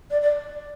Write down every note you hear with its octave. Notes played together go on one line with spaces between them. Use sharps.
D5
D5